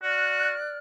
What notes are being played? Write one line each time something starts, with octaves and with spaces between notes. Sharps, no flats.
F#4 D5 F6 F#6